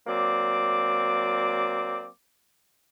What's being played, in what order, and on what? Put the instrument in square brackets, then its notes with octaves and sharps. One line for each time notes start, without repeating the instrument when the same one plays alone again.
[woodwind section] F#3 A#3 C4 D5 D6